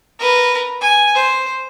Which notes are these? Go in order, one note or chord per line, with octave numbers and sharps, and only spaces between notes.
A#4 B4
G#5
C5